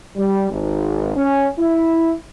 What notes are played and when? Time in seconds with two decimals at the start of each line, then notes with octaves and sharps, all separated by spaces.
0.16 G3
0.50 G#1
1.15 C#4
1.58 E4